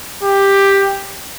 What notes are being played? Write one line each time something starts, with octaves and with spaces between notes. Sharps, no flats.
G4